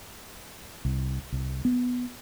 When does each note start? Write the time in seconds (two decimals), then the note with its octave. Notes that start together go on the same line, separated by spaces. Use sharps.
0.85 C2
1.32 C2
1.65 B3